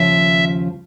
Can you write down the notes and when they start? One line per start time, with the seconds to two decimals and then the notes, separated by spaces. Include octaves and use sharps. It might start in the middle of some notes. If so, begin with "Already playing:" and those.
Already playing: D#2 C#3 F3 E5